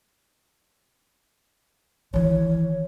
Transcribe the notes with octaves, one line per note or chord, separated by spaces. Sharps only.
D#3 E3 C#5